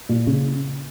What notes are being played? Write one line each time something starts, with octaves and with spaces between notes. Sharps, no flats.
A#2
C#3 C#4